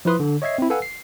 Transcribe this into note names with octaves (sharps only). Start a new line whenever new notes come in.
F3 E4 B4 C6 D#6
D3
C#5 D#5 E5 G#6 C7
C4 E4
A4 B4 F5 F#5 G#5 E6
C7